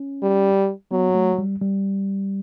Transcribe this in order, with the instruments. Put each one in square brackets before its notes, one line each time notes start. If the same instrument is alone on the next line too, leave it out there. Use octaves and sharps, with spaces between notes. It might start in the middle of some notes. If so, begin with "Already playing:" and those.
Already playing: [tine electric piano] C#4
[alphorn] G3
[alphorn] F#3 [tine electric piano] B3
[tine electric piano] A3
G3
G3